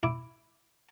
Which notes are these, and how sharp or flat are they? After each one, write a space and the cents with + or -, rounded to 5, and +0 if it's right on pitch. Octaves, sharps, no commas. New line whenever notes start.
E4 +0 D6 +0